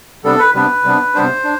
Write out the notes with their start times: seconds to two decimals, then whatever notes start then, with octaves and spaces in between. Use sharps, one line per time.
0.24 C3 G3 B3 D4 A4
0.38 B4
0.54 C3 G3 B3 D4 B4
0.84 C3 G3 B3 D4
1.15 C3 G3 B3 D4 C5
1.44 D4